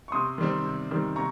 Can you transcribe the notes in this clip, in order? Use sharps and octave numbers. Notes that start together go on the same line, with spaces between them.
C#6
C3 C6 D#6
D#3 G3 C4
C3
D#3 G3 C4
C3 A#5 C#6